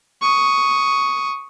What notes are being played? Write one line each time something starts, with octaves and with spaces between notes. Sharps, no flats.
C#6 D#6